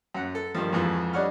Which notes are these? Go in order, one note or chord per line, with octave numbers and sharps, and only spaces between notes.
F#2 F#5
A4
G2 D#3 F3
F2 G#2 E3 F3
G3 D4 D#4 C#5 F#5 F6